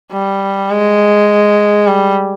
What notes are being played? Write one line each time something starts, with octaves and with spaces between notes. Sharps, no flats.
G3
G#3
G3